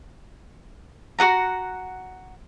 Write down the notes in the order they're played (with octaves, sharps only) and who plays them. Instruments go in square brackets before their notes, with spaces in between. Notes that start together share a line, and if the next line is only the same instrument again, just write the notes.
[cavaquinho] F#4 G#4 F#5 A#5